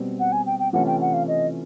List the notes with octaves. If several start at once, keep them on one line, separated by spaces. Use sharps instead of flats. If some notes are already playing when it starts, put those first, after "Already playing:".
Already playing: B2 G3 C4
F#5
G#5
G5
G5
C3 E3 A3 C#4 F4 F#5
G5
F#5
F5
D#5